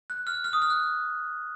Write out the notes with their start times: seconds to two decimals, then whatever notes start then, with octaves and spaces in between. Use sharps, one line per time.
0.10 F#6
0.27 F6
0.44 F6
0.53 D#6
0.62 F6
0.70 F#6